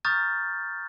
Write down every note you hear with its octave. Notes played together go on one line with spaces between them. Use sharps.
A#5 C#6 D#6 F6 G6 A6